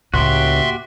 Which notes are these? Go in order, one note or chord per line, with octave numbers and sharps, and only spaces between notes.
C#2 A2 A#3 F#4 G4 E5 C6